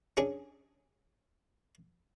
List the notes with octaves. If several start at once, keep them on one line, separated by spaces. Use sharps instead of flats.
C#4 D4 G#4